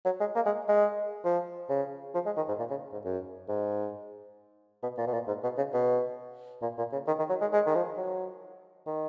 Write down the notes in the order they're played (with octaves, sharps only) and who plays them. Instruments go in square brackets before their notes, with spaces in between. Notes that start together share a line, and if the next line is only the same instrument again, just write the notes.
[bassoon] F#3
G#3
A#3
G#3
G#3
F3
C#3
F3
G#3
D#3
G#2
A#2
C#3
G#2
F#2
G#2
B2
A#2
B2
A#2
G#2
B2
C#3
B2
A#2
A#2
C#3
D#3
D#3
F#3
G#3
G#3
D#3
F3
F#3
D#3